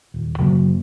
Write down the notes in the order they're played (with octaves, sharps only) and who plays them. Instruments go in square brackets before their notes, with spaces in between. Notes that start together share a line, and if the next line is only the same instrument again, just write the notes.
[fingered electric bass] D#1
F#2 C#3 F#3 A#3